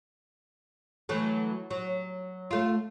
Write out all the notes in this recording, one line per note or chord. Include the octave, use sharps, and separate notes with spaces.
E3 F#3 A3
F#3
A3 F4